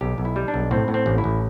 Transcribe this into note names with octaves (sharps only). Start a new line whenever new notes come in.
B1 G4
B1
E4
G3
D4
B1
A2 C4
A2
C4
A1
E4
A1